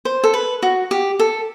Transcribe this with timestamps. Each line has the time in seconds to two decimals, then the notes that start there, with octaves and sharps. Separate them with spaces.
0.05 C5
0.24 A4
0.34 B4
0.63 F#4
0.91 G4
1.19 A4